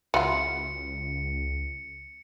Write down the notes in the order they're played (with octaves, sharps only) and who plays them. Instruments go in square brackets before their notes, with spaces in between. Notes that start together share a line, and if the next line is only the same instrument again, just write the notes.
[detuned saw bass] C#2 [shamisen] F#3 E4 F4 [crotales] C#7